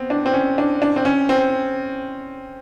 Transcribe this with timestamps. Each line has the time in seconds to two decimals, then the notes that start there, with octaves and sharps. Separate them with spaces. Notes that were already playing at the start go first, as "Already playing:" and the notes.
Already playing: B3 C4
0.10 D4
0.26 C4
0.33 C#4
0.58 D4
0.82 D4
0.96 C4
1.05 C#4
1.29 C4